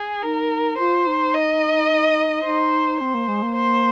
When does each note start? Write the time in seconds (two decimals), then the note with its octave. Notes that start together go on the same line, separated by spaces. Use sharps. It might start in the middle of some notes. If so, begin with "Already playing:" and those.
Already playing: G#4
0.23 D#4 A#4
0.78 F4 C5
1.06 D#4
1.34 D#5
2.44 D#4 C5
2.99 C4 C5
3.14 A#3
3.28 G#3
3.42 A#3
3.55 C5